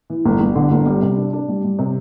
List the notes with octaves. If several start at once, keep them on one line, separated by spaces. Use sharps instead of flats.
E3
G1
G1
D3
G1
G3
C3
D4
D4
G3
G3
C3